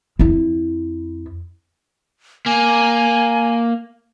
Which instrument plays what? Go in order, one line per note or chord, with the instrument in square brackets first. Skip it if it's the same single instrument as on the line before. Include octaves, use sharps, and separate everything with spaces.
[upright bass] F2 E4
[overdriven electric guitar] A#3 [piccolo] G#5